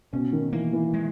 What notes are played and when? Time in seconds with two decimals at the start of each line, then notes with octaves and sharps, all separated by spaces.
0.13 B2 C#4
0.33 D#3
0.53 E3 A#3
0.73 E3
0.94 G#3